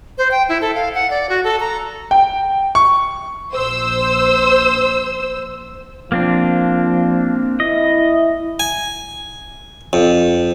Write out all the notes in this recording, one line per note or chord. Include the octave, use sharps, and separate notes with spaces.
C5
G5
E4
A4
F5
F#5
D5
F#4
A4
A#5
G5
C#6
A#1 C5 E6
F3 A#3 C4 D4
E4 D#5
G#5
F2